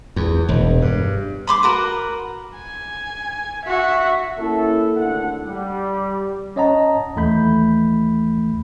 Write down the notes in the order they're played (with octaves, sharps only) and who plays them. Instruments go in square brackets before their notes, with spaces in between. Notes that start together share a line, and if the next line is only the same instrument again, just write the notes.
[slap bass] E2
E1
G2
[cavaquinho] B5 C6 D6
F#4 A#4 B4
[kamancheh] G#5
F#4 E5
[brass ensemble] A#3 C#4 E4 A4
G#1 A2 D3 F#5
G3
[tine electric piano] C#4 C#5 D#5 F#5 A5 A#5
D#2 E3 A3 B5 G6